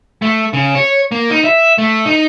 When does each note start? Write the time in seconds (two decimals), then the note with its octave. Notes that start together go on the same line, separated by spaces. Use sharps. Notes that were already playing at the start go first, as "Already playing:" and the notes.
0.22 A3
0.53 C#3
0.75 C#5
1.12 A#3
1.30 D#4
1.44 E5
1.78 A3
2.06 D#4